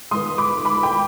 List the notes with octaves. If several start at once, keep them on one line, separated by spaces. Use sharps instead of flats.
G#2 D#3 B3 C6 D#6
B5 D6
B5 D6
G5 B5